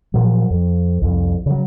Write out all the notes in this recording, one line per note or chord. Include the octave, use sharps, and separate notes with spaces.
A#2 F3 F#3
F2
C2 F2
C#3 F#3